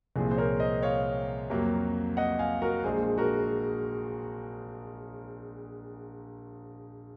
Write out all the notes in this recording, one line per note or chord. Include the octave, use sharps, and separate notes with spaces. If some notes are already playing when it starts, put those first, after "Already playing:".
C2 A#2 F3 C4 G#4
C5
A#4 C#5
C5 D#5
C#5 F5
F2 C3 F#3 A#3
D#5 F#5
F5 G#5
F#4 A#4
A#1 A#2 G#3 G#4 C5
F#4 A#4